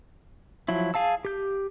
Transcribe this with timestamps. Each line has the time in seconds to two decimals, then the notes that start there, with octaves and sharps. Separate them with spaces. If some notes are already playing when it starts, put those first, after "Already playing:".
0.68 F3 F#3 E4
0.94 G#4 F5 A5 E6
1.25 G4 G6